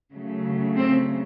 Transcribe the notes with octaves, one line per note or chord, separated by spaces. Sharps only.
C#3 F#3 A3
C4